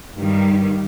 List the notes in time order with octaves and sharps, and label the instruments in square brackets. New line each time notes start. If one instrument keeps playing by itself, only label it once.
[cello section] G2 D#3 G3